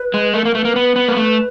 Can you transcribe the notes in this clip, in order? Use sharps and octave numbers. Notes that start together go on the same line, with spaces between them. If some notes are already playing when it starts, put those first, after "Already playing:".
Already playing: B4
G#3
A3 A#4
A#3 A#4
A3 B4
A#3 B4
B3 B4
B3
A#3
A3